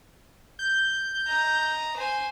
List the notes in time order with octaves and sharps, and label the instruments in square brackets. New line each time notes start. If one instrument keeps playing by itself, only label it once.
[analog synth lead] G6
[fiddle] D#5 A#5
C5 G#5